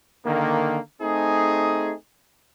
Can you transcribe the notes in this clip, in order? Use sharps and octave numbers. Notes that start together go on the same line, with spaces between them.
D3 D#3 A#3
A3 C4 D#4 G#4